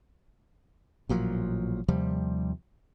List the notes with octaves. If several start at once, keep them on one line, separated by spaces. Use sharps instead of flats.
A1 A#2 F3 F#3
D#2 C3 F3 G3